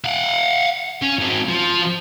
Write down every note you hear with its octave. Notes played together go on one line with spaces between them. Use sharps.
F5 F#5
C#4
G#2 C4
F3